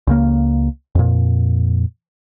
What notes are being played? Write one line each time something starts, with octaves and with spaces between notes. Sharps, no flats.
C#2 C#3 A#3
F2 A#2